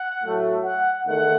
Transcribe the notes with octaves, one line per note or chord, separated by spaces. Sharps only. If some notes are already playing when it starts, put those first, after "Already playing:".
Already playing: F#5
A2 F#3 A3
F#5
E2 D#3 A3 F#5